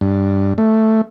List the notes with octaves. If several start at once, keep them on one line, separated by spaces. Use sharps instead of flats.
G2
A3